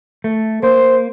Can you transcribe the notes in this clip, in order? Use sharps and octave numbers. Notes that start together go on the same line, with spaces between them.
A3
A#3 C5